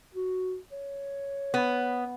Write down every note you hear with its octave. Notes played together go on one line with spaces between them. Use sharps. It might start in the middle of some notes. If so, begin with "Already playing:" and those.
F#4
C#5
B3